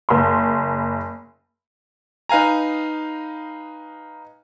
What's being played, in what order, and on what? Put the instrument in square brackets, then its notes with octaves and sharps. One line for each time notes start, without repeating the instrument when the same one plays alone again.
[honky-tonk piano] F#1 C6
[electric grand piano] D#4 B4 F5 G#5 A#5